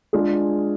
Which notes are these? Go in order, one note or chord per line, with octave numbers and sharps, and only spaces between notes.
G#3 D4 F4 G#4